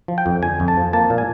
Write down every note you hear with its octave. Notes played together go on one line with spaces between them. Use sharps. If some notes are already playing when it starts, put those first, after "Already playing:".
F3
G5
F2
D3 G#5
F2
A5
F3
A#3 A5
A#2
G#5